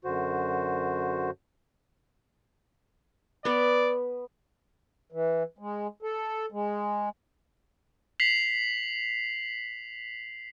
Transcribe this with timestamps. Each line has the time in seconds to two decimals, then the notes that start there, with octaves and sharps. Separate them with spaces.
0.05 F#2 D3 F#4 C5
3.45 B3 B4 D5
5.12 E3
5.59 G#3
6.02 A4
6.52 G#3
8.20 B6 C7 F7 F#7